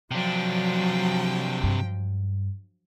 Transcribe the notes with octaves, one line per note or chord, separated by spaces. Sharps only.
C3 F3 F#3 D4 G5
G2